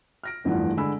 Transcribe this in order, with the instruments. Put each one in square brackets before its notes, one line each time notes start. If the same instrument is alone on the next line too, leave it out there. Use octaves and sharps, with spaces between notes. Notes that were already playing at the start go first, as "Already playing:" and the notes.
[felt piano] F6 A#6 D7
F1 E2 G2 D#3 F3 F#5
D3 G#3 G#5 B5 E6